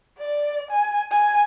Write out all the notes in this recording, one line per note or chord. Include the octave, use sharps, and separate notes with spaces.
D5
G#5
G#5